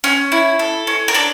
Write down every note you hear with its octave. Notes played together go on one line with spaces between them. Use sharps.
C#4
E4
A4
C#4
A#4
D4 A4